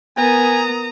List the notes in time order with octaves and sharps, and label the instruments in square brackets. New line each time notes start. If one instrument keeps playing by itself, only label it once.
[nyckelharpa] B3 A#4 [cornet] G#5 [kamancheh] A#5 D#6